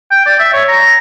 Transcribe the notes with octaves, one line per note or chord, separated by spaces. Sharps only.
G5
D5
E5
C#5
A#5